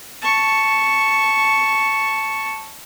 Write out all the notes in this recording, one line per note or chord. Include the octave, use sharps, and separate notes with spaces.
A5 C#6